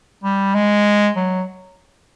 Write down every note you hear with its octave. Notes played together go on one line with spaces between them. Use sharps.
G3
G#3
F#3